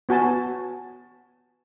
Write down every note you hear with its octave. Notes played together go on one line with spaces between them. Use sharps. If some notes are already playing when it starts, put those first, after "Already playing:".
B3 F#4 G#5 A5